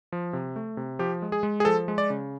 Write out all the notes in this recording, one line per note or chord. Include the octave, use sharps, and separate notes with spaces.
F3
C3
A3
C3
F3 G4
G#3
G#4
G#3
G#4
F3 A4
G#3
D5
C#3